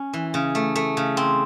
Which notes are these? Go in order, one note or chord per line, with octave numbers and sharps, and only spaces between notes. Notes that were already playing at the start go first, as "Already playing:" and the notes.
Already playing: C#4
E3
C#3
A3
A3
C#3
C4